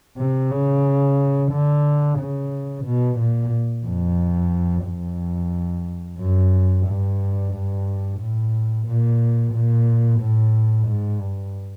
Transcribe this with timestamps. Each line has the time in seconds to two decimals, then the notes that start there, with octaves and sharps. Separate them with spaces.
0.18 C3
0.51 C#3
1.51 D3
2.19 C#3
2.85 B2
3.19 A#2
3.85 F2
4.86 F2
6.19 F#2
6.86 G2
7.53 G2
8.20 A2
8.87 A#2
9.53 A#2
10.20 A2
10.87 G#2
11.20 G2